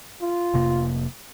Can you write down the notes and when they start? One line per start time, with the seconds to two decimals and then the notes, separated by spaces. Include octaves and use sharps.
0.22 F4
0.54 F1 C3 A#3